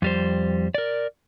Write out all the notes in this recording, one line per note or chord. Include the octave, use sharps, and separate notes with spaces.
F2 G3 C5
A#4 D5